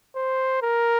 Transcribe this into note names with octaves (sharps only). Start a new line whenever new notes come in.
C5
A#4